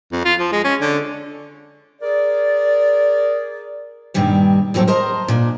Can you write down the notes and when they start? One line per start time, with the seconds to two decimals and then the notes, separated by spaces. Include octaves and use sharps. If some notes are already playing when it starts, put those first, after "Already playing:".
0.12 F2
0.25 F4
0.39 F3
0.52 G#3
0.64 C#4
0.81 D3
2.01 G#4 A#4 D5
4.14 G2 A#2 D#3 G3 C#5
4.74 E2 A2 F#3 C4 A4
4.88 A#4 C5 D#5 A5 A#5
5.28 A#2 D4